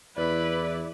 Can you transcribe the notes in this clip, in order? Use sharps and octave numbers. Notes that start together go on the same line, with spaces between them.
E2 E4 B4 D5